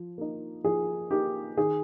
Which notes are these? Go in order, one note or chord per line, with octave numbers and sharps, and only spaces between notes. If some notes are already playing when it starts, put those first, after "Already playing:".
Already playing: F3
A#3 D#4
F3 G#4
A#3 D#4 G4
D#3 G#4